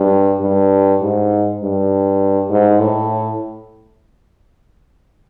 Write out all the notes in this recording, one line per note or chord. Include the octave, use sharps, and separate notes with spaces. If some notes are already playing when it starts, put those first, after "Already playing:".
Already playing: G2
G2
G#2
G2
G#2
A2